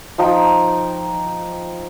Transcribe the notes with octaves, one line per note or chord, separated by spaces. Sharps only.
F3 D#4 G5 A#5